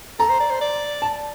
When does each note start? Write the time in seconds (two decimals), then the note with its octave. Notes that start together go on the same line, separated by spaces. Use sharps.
0.19 A4 A#5
0.29 C5
0.40 D5
0.50 C5
0.61 D5
1.02 A5